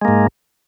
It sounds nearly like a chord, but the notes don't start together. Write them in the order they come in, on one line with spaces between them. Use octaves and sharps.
G#3 A#3 G#2